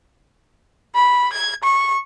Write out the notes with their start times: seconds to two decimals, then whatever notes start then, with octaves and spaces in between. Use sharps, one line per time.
0.95 B5
1.33 G#6
1.63 C#6